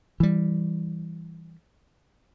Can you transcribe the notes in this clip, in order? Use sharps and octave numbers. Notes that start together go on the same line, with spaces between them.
E3 G3